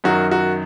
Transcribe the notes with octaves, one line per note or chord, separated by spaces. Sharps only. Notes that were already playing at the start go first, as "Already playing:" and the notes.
F#2 D#3 F#3 F#4
F#4